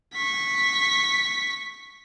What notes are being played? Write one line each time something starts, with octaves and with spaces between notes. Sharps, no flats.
C#6 B6